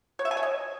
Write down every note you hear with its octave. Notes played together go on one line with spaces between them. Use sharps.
C#5
E5
G#5
C#5
D#5